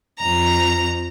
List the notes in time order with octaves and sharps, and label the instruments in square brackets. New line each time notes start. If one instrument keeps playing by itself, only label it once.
[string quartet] F2 A#5